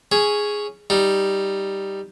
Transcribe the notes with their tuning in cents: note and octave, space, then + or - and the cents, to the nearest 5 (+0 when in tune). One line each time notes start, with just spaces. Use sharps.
C#4 +0 G#4 +0
G3 +0 D#4 +0